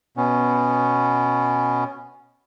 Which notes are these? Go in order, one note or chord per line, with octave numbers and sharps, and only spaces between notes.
B2 B3 C#4